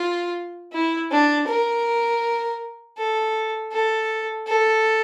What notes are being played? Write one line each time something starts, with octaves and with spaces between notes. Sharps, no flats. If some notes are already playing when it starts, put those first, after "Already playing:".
Already playing: F4
E4
D4
A#4
A4
A4
A4